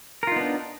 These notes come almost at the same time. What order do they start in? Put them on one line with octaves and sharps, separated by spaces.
A#4 F4 D#4 B3 D4